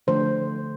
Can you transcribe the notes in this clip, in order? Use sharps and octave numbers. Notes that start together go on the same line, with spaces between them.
D3 F3 A3 D4 C5